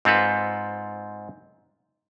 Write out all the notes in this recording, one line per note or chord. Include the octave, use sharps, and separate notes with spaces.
G#2 C4 F4 A4 B4